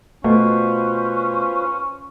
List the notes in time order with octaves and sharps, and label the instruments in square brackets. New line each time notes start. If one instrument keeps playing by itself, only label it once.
[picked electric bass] B2 [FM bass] A3 [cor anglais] C#4 [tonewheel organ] F4 B4 C5